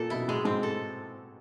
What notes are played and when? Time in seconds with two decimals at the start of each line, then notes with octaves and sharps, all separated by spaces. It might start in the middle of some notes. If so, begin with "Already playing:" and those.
Already playing: A#2 A4
0.10 B2 E4
0.28 A2 G#3
0.45 G#2 C4
0.63 A4